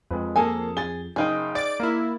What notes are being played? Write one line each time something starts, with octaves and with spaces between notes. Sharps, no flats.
F2 G#3 B4
A#3 G#4 A4 G#5 A5
G#4 A6 G7
F#1 D#4 G#4 F5 G5
D5 A6 D7
A#3 E4